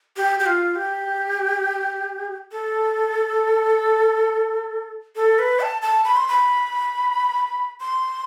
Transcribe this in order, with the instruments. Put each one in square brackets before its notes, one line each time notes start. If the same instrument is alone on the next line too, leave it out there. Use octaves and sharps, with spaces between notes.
[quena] G4
G4
F4
G4
A4
A4
B4
A5
A5
B5
C6
B5
C6